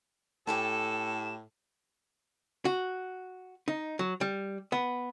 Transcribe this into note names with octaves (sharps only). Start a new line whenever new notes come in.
A2 G4 A4 G#5 A5 E7
F#4
D#4
F#3
G3
B3